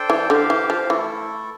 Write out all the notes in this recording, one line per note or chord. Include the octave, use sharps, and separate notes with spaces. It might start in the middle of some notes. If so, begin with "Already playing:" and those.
Already playing: D4 A4 C5 G5
E3
D3 G4 C5 F5
E3
F3
E3 A3 E4 A4